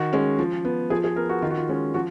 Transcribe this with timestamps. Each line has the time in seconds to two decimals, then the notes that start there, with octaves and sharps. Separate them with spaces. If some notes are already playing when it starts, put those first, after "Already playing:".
Already playing: D#3 F#4
0.13 G#3 C#4
0.39 F3
0.65 B3
0.90 F3 G#4
1.04 G#4
1.16 B3 A#4
1.29 F#4
1.42 D#3 F4
1.50 F#4
1.58 F4
1.69 G#3 C#4
1.94 F3 F#4